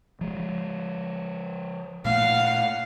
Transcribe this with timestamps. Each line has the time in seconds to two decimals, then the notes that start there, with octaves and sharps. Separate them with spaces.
0.21 F3 G#3
2.05 A#2 A3 A#3 F5 F#5